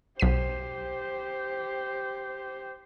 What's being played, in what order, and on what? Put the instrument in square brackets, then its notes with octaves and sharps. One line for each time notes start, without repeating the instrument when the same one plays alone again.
[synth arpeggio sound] B1 B6 D#7 [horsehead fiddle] G4 C5